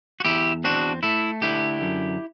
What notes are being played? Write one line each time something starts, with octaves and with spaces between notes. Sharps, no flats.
F#4
E2 E4 G4
C4 D4 F#4
A3 E4
D3 E4 G4
F#2